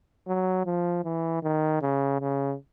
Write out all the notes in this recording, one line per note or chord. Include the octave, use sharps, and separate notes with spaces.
F#3
F3
E3
D#3
C#3
C#3